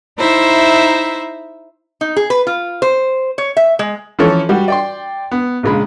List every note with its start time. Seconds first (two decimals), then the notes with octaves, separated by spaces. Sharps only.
0.17 D#4 E4 C5 E5
2.01 D#4
2.16 G#4
2.30 B4
2.47 F4
2.82 C5
3.38 C#5
3.57 E5
3.79 G#3
4.19 E3 F3 C#4 A4 C#5
4.49 G3 F#4 G4
4.68 D5 G5 C6
5.31 B3
5.63 A#1 C#3 G#3 B5